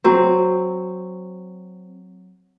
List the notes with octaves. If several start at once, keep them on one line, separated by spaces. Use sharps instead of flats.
F#3 C4